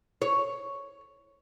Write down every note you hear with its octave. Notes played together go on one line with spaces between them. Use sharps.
C#5